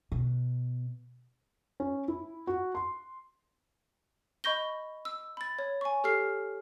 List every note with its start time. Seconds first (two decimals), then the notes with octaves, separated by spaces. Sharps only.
0.12 B2
1.80 C#4
2.08 E4
2.47 F#4
2.75 C6
4.44 D#5 B5 C#6 G6 A#6 G7
5.05 E6
5.37 B5 A6
5.59 C#5
5.81 G#5 C#6
6.04 G4 A4 F6 C7